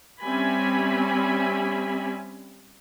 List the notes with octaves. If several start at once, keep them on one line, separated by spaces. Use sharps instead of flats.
G3 C4 C#4 E5 G#5 B5